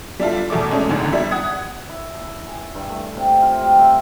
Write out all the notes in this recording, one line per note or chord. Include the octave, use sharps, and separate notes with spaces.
G3 D4 E4 F4 A4
E2 B2 A3 D6
G#3 A3 C#4 D4
G#1 C#2 G#2 D3
G3 E4
F#5 D#6 G#6
E4
A5
G#5
G2
A3
C3
F4
G4
E5